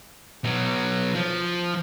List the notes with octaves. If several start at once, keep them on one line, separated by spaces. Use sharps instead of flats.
B2 F#3
F3